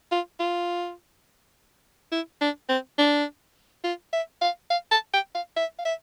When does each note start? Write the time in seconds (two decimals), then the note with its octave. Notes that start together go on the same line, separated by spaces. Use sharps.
0.11 F4
0.40 F4
2.12 E4
2.41 D4
2.69 C4
2.98 D4
3.84 F4
4.13 E5
4.42 F5
4.70 F5
4.91 A5
5.13 G5
5.35 F5
5.56 E5
5.79 F5
5.85 E5